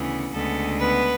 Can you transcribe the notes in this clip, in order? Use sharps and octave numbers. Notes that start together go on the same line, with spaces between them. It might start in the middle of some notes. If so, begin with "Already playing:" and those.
Already playing: D2 C#3 E3 B3
D2 C#3 G#3 B3 A4
B3 B4